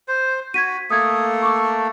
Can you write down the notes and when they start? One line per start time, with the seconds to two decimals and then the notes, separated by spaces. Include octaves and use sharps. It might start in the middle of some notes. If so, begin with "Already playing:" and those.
0.08 C5
0.54 F#4 G#6 B6 D#7
0.90 A3 A#3 A4 D#6 G#6
1.42 C#6 D6